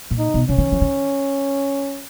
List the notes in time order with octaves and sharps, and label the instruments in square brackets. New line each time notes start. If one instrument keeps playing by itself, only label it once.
[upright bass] A#2
[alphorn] D#4
[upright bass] B2
[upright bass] C#3 [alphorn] C#4
[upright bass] D#3
F3
D#3